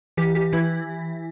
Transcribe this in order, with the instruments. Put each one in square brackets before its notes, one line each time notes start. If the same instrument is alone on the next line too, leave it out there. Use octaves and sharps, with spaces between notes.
[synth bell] E3 G4
G4
E3 E4